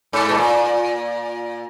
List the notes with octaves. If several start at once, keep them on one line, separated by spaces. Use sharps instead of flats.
G#2
B2
A#2